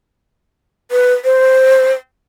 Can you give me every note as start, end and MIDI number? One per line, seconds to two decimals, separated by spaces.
0.91 1.14 71
1.24 1.92 72